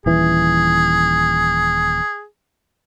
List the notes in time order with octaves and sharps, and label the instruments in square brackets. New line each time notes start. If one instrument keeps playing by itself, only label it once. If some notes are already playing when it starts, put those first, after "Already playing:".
[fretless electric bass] D#1 E3 [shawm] G#4